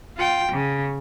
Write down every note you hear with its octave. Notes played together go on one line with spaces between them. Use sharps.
F4 G5
C#3